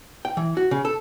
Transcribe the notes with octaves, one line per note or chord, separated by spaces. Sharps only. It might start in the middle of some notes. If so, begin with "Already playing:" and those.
G5
E3
F#4
C#3
A4